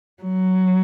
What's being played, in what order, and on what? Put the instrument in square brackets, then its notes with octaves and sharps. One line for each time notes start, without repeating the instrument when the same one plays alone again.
[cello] F#3